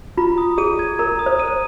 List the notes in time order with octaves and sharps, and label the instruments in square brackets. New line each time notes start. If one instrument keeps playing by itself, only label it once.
[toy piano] F4 [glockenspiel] A#5
[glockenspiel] D#6
[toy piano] G#4 [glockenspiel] D#7
[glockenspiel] G#6
[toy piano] A#4 [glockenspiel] A#5
[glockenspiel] D#6
[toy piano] C5
[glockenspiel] D#7